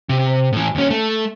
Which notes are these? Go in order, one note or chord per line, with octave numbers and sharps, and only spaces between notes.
C3
A2 E3
D#2 C#4
A3